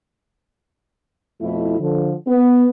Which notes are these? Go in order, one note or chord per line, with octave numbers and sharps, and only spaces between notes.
F2 B2 A3 E4
D3 F3
B3